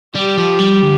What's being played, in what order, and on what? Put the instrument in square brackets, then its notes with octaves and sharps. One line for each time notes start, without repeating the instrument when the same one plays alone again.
[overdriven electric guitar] G3 [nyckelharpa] G4
[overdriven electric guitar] F3
G3
D3